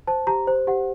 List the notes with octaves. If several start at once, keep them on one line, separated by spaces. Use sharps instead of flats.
C5 A5
G4 A#5
C5
G4 F#5